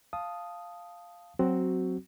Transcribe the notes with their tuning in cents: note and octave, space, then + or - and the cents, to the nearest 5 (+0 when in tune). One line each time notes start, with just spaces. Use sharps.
F5 +0 A5 -10 D#6 +0
F#3 +0 C4 +0 F#4 +10